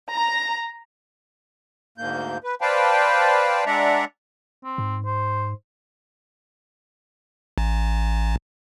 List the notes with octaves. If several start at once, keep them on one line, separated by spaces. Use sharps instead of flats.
A#5
D2 G#2 A#3 G6
B4
B4 C5 D5 F5 G5 A5
G#3 D4 D5 E5 F#5 A#5
C4
G#2
C5
A1